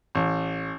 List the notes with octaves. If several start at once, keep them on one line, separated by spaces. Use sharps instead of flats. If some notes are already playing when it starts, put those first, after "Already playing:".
A1